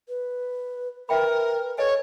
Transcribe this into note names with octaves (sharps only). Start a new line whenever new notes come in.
B4
A#4 B4 E5 G5 B5
A4 B4 C#5 D#5 G#5